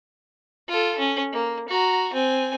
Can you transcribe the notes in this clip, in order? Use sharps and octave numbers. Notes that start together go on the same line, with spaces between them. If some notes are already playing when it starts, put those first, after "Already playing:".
F4 A4
C#4
A#3
F#4 A#5
C4 G#5